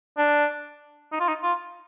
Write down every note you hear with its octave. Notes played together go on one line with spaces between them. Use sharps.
D4
D#4
F4
D#4
F4